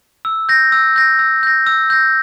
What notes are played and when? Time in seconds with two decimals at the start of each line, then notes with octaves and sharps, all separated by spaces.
0.25 E6
0.49 G6 A#6
0.72 E6
0.96 G6 A#6
1.19 E6
1.43 G6 A#6
1.67 E6
1.90 G6 A#6